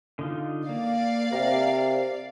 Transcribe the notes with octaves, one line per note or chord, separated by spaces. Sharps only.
D3 D#4 F4
A#3 D5 F5
C3 A#4